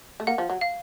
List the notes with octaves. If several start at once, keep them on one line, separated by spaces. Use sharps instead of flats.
A3
A#3 F#5
F3
F#3
F5